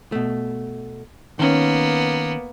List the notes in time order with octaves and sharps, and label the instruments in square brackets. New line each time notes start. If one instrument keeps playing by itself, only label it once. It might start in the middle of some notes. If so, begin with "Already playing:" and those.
[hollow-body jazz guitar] B2 A3
[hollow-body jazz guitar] D#3 C#4 [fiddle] A#3 B3